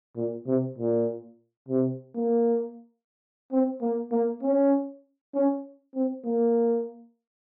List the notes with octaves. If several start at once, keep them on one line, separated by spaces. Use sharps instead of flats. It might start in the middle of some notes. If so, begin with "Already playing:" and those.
A#2
C3
A#2
C3
A#3
C4
A#3
A#3
C#4
C#4
C4
A#3